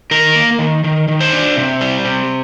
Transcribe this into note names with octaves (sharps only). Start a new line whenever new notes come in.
D#3 A#4
A#3
D#3
D#3
D#3
C5
D4
C3
G3
C3